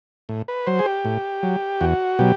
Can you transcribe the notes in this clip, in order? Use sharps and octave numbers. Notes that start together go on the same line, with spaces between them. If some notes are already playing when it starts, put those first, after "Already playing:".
A2
B4
F#3 C5
G#4
G4
A2
F#3
E2 F#4
B2 F#3 G4